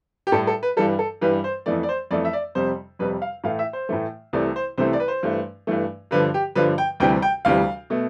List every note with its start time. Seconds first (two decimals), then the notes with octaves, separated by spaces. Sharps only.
0.27 G4
0.32 A2 G3 A4
0.47 A4
0.63 B4
0.77 G2 E3 G3 A4
0.99 A4
1.22 G2 E3 G3 B4
1.44 C5
1.66 F2 E3 A3 D5
1.83 D5
1.89 C5
2.11 F2 E3 A3 D5
2.25 E5
2.33 D5
2.55 F2 C3 G3 C5
2.99 F2 C3 G3 B4
3.22 F5
3.44 A2 E3 A3 F5
3.59 E5
3.73 C5
3.89 A2 E3 A3
4.33 C2 C3 E3 A3 D5
4.56 C5
4.78 C2 C3 E3 A3 C5
4.93 D5
5.00 B4
5.08 C5
5.23 G2 E3 A3
5.67 G2 E3 A3
6.11 G2 D3 F3 B4
6.34 G4
6.55 G2 D3 F3 B4
6.78 G5
7.00 D2 C3 E3 G3 G5
7.22 G5
7.45 D2 C3 E3 G3 F5
7.90 B2 A3